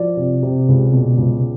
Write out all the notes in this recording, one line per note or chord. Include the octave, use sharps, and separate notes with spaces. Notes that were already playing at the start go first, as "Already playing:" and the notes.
Already playing: F3 D5
C3
C3
C#2
B2
C#2